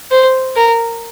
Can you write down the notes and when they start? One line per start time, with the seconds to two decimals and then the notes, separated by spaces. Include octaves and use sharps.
0.11 C5
0.56 A#4